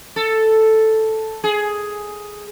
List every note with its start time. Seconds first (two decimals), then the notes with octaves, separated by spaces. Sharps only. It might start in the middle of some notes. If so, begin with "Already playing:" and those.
0.16 A4
1.44 G#4